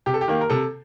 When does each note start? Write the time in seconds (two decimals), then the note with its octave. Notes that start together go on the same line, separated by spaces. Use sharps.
0.06 C3 G4
0.14 A4
0.21 G4
0.28 D#3 A#3
0.41 A#4
0.50 C3 A4